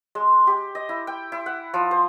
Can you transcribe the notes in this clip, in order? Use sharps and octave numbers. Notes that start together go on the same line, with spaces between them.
G#3
G4
D#5
E4
G5
E4
F#5
F3
C5